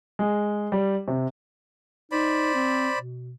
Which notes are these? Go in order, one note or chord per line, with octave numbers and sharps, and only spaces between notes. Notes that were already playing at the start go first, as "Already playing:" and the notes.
G#3
G3
C3
D#4 C5 D5 B5
C4
B2